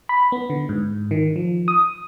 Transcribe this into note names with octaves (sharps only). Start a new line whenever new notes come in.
B5
B3
D3
G#2
D#3
F3
D#6